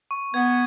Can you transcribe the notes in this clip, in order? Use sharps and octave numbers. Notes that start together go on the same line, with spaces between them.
C#6
B3 G#6